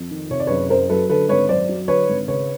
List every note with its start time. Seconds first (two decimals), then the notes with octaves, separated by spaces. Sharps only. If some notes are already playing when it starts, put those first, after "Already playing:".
Already playing: F2
0.11 D#3
0.30 C3 C#5
0.40 D5
0.47 F#1 B4 C#5
0.70 F#2 A#4 C5
0.89 F#3 A4 B4
1.10 D3 A4 B4
1.29 G#1 B4 C#5
1.49 F#2 C5 D5
1.69 F#3
1.88 D3 B4 C#5
2.09 G#1
2.28 C#3 B4 C#5